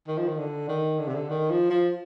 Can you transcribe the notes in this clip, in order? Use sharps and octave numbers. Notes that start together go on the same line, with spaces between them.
D#3
F3
D#3
D3
D#3
D3
C3
D3
D#3
F3
F3